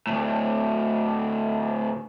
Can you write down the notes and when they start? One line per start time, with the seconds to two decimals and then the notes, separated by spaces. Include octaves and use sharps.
0.07 D2 A2